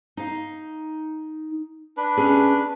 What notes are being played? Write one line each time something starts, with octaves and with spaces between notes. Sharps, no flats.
D#4 F5
D4 B4
C#4 G#4 E5